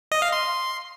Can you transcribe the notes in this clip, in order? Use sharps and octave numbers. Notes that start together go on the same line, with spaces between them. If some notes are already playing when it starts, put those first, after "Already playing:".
D#5
F5
C6